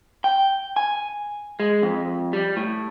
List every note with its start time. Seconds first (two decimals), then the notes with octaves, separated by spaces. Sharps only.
0.24 G5
0.76 G#5
1.60 G#3
1.82 F2
2.33 G3
2.57 A2